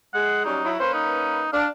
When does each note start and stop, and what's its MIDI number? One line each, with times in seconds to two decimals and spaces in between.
0.14 0.43 56
0.14 0.43 68
0.14 0.44 78
0.45 0.60 54
0.45 0.60 55
0.45 0.60 61
0.45 0.70 63
0.65 0.80 54
0.65 0.80 64
0.80 1.43 58
0.80 1.43 61
0.80 1.43 71
0.80 0.90 72
0.94 1.52 63
1.52 1.66 62
1.52 1.67 77